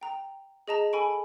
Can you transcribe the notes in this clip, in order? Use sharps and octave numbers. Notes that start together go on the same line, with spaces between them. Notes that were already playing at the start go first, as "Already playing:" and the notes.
G5 A#5
G#4 D#5 A5 A#5
A4 G#5 B5 C#6 D7